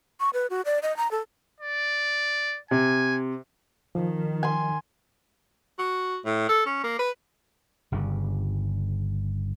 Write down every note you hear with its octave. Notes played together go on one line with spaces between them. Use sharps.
C#6
B4
F#4
D5
D#5
A#5
A4
D5
C3 G#5
D#3 F3
G#5 C6
F#4
A2
A4
C#4
A#3
B4
G1 G2 C#3